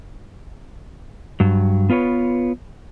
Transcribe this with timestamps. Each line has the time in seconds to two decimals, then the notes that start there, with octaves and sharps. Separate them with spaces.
1.40 G2 F#3
1.89 B3 F4 B4 C#5